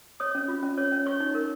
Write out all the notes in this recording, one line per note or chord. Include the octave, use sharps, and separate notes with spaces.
C#5 D#6
C#4
F4
C#4
C#5
C#4
C#5 C#6
D#4
A#4